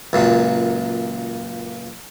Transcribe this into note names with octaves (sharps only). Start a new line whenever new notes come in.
C#2 F#2 A#2